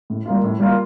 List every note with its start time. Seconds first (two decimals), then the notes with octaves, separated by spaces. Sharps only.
0.10 A2
0.26 G3 A#3 F4
0.44 A2
0.59 G3 A#3 F4